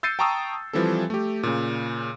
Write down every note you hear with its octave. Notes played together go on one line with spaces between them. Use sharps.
E6 G6 A6 C7 C#7 D#7
G5 A5 A#5 C#6 D#6 E6
E3 F3 G3 C4 A4
A3 G4
A#2 C#3